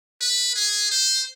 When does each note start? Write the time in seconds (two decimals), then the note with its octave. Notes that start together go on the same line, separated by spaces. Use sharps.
0.21 B4
0.56 G#4
0.91 C5